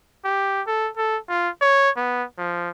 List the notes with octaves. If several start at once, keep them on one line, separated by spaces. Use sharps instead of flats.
G4
A4
A4
F4
C#5
B3
F3